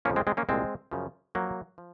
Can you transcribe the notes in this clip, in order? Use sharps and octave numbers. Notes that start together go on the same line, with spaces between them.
F2 C#3 F3 A#3 C#4
G#3 C4
G#3 C4
A#3 C#4
C2 A#2 F3 G#3 C4
F#2 C#3 F3
F#2 F3 F#3 A#3
F3